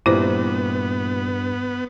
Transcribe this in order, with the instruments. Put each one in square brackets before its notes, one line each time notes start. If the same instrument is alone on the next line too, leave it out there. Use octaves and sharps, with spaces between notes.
[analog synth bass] G2 [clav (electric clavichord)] A#2 E3 G3 [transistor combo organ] B3 [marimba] E4 C5